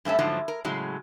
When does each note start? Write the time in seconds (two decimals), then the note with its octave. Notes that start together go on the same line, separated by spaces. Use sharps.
0.05 G2 A3 C#4 E5
0.19 G#2 D3 F3 F#3 A3
0.48 A#4
0.65 A2 C#3 F#3 G#3